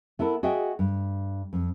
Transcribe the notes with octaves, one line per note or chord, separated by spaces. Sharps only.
B3 E4 A4 A#4
F#4 G#4 D#5 E5 G5
G2
F2